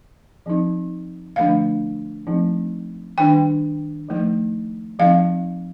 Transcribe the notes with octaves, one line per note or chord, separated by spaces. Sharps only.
F3 C4 D#4
D3 F3 A3 D4 F5
F3 A3 C4 D#4
D#3 G3 D4 G5
F3 A3 D#4
F3 C4 D#4 F5